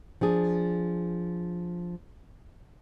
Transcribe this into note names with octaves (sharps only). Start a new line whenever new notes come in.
F3 D4 G#4